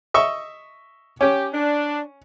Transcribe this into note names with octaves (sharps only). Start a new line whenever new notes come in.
D#5 E5 C#6
C#4 G4
D4